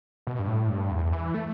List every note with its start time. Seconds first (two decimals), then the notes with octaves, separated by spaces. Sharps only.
0.27 B2
0.39 G2
0.48 A2
0.69 G2
0.91 E2
1.13 E3
1.34 A3